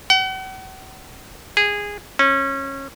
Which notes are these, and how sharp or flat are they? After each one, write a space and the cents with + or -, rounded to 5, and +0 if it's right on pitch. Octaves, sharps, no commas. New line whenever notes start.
F#5 +40
G#4 -15
C#4 -25